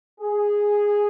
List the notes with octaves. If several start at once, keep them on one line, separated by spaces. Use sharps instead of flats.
G#4